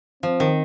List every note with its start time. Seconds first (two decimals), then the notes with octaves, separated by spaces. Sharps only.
0.23 F3 C4
0.40 D#3